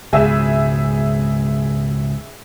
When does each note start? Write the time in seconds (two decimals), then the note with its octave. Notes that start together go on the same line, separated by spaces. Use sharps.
0.13 C#2 G#2 B2 G#4 E5